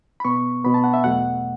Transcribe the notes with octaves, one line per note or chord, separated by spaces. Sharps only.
B5
B2 B3 C#6
B2 B3 B5
A5
F#5
E5
E2 B2 F#3 A3 F#5